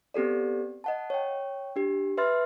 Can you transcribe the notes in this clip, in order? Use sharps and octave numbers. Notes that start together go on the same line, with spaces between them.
B3 C4 G4 A4 D5
D#5 F#5 A5
C#5 G5
D4 G4
B4 E5 C6 F6 A6